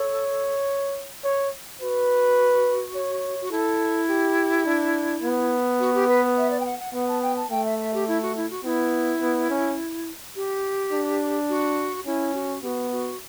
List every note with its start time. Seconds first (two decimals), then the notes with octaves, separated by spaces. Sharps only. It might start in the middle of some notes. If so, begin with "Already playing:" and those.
Already playing: A4 C#5
1.24 C#5
1.81 F#4 B4
2.96 C#5
3.41 F#4
3.52 E4 A4
4.09 G4
4.65 D4
5.22 B3
5.80 F#4
5.94 G4
6.08 B4
6.37 E5
6.50 D5
6.60 G5
6.65 F#5
6.79 F#5
6.94 B3 F#5
7.08 A5
7.22 G5
7.36 A5
7.50 A3 G5
7.65 E5
7.79 E5
7.94 G4
8.08 E4
8.22 F#4
8.36 E4
8.50 F#4
8.64 B3 E4
9.21 B3
9.50 C#4
10.36 G4
10.92 D4
11.49 F#4
12.06 C#4 E4
12.34 F#4
12.63 B3 F#4 G4
12.91 F#4